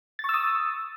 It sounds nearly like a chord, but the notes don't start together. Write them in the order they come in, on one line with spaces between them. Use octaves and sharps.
A6 C#6 E6 D#6